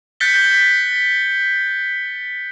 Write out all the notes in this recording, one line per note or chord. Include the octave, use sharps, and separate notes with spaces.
F#6 G6 A6 B6 C#7 G7